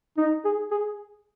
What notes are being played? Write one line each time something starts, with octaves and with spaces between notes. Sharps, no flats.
D#4
G#4
G#4